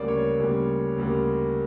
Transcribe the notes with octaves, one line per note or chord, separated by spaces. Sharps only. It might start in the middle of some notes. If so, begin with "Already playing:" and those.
Already playing: D2 C#3 G3 A#3 D5
C#5
D2 C#3 G3 A#3
D2 C#3 G3 A#3